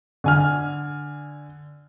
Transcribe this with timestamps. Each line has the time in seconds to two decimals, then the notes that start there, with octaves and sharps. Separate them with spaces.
0.24 D3 G#5 F6